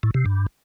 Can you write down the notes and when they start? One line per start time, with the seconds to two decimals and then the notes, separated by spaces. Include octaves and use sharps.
0.03 A2
0.14 C3
0.26 G2